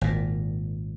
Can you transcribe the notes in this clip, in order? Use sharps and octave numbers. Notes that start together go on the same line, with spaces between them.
G#1 A#2